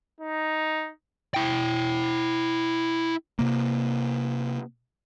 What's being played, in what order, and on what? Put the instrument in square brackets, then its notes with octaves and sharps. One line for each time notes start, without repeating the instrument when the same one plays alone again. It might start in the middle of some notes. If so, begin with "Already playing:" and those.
[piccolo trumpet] D#4
[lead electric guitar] E4 G5
[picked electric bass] C3 A#3